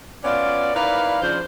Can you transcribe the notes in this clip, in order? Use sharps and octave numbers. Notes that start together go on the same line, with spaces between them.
B3 C#4 F4 D5
D#4 E4 A#4 B4 D5 F5
C#3 F3 D4 F4 C5